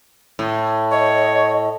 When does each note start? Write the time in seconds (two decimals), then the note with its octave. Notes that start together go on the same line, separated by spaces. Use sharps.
0.39 A2
0.92 C#5 D#5